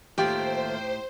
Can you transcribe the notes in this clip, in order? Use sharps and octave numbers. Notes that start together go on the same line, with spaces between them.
D#2 A2 A3 D#4 F4 G4 C5 G5